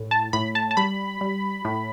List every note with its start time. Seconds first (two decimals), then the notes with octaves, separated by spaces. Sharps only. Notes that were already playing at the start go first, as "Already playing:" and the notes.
Already playing: A2
0.11 A5
0.33 A2 B5
0.55 A5
0.71 A5
0.77 G3 B5
1.21 G3
1.65 A2